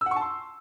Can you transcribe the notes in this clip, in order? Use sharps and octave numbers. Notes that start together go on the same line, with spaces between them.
E6
F#5
C#6
A5
C6